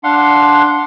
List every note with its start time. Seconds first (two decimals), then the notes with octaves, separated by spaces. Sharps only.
0.04 D4 F5 F#5 C6